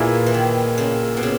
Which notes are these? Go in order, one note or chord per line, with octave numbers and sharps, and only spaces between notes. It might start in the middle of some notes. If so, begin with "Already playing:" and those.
Already playing: A#2 E3 A#3 E4 G#4
E3
D#3
C#3
B2
C#3